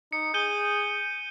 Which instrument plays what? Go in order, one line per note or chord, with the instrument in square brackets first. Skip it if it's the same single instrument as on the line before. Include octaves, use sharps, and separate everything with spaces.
[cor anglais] D#4 [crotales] C#7
[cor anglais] G#4 [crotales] G6 D#7 G7